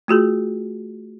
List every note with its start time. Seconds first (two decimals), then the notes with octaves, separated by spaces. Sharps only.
0.08 A3 F4 F#4 G#4